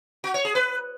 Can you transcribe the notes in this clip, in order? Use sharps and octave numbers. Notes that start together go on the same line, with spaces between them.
F#4
C#5
G#4
B4